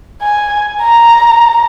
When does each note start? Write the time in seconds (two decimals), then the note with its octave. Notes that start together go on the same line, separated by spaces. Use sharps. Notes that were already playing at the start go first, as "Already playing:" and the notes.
0.22 G#5
0.82 A#5